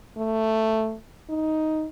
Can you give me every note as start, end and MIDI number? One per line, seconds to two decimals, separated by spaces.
0.17 0.96 57
1.30 1.87 63